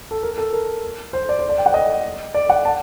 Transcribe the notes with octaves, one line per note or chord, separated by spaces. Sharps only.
A4
A#4
A4
A#4
C5
D5
C5
D5
G5
F#5
D#5
D5
F#5
A5